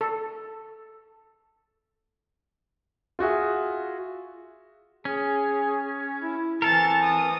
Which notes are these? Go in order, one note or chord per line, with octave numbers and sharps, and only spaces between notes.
A4
F4 F#4 G#4 E5
C#4 G#4
E4
E3 C4 A4 A#4 A5 A6
D#6